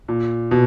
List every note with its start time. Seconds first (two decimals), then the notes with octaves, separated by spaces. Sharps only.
0.08 A#2
0.51 B2